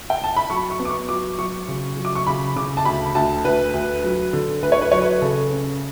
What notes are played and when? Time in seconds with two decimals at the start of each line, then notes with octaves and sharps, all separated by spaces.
0.10 G5
0.24 A5
0.36 B5
0.50 F#3 C#6
0.70 C#6
0.79 B3
0.85 D6
0.89 C#6
1.09 F#3 D6
1.39 F#3 C#6
1.68 C#3
1.97 F#3
2.05 D6
2.15 C#6
2.27 C#3 B5
2.56 C#3 D6
2.77 A5
2.85 D2 B5
3.15 D2 A5
3.45 D2 B4
3.74 D2
4.04 F#3
4.33 D3
4.62 D2 B4
4.72 C#5
4.81 B4
4.91 F#3 C#5
5.01 B4
5.21 C#3 A4
5.51 C#4